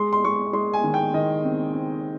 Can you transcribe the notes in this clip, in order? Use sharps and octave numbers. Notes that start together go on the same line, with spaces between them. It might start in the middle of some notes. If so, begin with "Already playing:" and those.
Already playing: G#3 C6
C6
G#3 C#6
G#3 C6
G#5
D#3
G5
D#3 D#5
C4
C4